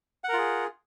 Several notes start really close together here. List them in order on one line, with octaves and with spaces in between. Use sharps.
F#5 A#4 F4 G#4